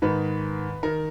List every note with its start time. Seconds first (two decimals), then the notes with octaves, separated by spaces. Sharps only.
0.02 G#2 D#3 B4
0.83 D#3 A#4